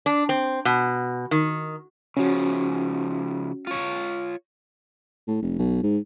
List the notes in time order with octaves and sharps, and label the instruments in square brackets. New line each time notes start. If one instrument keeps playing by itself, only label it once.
[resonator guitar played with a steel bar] D4
C4
B2
D#3
[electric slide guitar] C#3 F3 [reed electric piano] C#4 F#4
[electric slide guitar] F4 C#5
[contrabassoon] A2
F1
B1
G#2